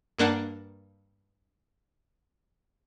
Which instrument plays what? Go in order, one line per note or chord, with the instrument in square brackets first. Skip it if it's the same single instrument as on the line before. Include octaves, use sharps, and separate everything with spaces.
[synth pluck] G2 A#3 D4 F#5